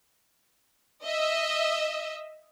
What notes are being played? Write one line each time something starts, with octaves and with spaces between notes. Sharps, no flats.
D#5 E5